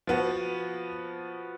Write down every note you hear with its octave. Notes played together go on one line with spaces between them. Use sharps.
F3 B3 F#4